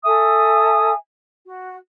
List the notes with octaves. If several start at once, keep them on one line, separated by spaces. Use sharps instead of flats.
A4 E5 G#5 D#6
F#4